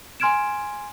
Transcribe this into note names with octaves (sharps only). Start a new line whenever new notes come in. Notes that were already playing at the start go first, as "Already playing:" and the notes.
G#5 C6 F6 G#6 D7 E7